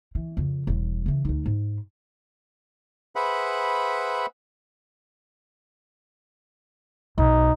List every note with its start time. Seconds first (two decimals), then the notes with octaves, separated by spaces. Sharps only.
0.15 E3
0.37 F2 C#3
0.67 E1 G3
1.06 C#3 E3
1.25 D2 D#4
1.46 G#2
3.16 G#4 B4 C5 E5 F#5 B5
7.18 B1 D#4